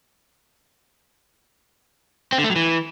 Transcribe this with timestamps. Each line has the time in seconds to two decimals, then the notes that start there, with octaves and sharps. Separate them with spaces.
2.33 C4
2.38 D3
2.44 A3
2.50 F#3
2.56 E3